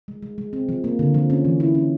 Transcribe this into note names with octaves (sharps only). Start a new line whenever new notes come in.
G#3
G#3
G#3
C4
F3
A#3
D3
F3
C#4
E3
E4
C#4